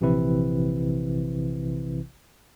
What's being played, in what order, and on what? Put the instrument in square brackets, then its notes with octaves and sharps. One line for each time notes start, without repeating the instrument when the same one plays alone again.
[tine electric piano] A#1 C3 E3 C4 E4 B4